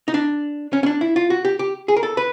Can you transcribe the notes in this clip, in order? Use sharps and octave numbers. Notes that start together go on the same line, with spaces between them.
D#4
D4
C#4
C#4
D4
E4
F4
F#4
G4
G4
G#4
A#4
A4
B4